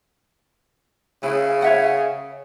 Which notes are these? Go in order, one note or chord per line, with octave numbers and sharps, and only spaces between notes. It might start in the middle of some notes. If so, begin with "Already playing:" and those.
C#3 E4
C#5 E5 F#5